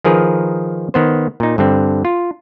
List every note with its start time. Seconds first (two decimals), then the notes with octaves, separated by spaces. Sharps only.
0.04 D#3 F3 G#4 A#4 B4
0.94 D#3 B3 C5
1.40 A#2 D#4
1.58 G2 D3 C4
2.05 F4